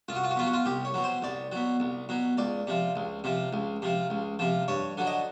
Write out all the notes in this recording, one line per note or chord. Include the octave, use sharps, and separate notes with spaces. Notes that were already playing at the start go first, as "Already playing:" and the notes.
C2 F4
F#4
F4
F#4
B2 F#3 F4
F#4
F4
C2 G4
C#5
B2 F#3
C5
C2 D5
B2 F#3
C2
B2 F#3
C#2 D5
C3 F3
C#2
C3 F3
C#2
C3 F3
C#2
C3 F3
G2 C#5
D3 F#3
D#5